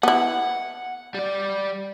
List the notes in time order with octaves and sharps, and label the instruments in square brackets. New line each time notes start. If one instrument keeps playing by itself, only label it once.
[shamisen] B3 E4 [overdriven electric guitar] F#5
[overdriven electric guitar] G3 D5